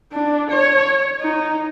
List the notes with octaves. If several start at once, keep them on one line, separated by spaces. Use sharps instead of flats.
D4
C#5
D#4